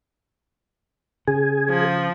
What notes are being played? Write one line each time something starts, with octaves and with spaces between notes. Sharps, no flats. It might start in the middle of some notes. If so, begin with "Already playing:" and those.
C#3 G#4
F3